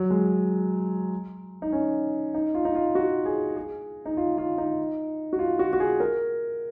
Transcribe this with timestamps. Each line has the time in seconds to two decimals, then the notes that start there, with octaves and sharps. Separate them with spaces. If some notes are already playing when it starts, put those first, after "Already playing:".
Already playing: F#3
0.10 G#3
1.62 D#4
1.72 C#4
2.34 D#4
2.54 F4
2.65 D#4
2.75 F4
2.95 F#4
3.25 G#4
3.56 G#4
4.06 D#4
4.17 F4
4.38 F4
4.58 D#4
5.33 F#4
5.39 F4
5.59 F#4
5.73 F#4
5.80 G#4
6.00 A#4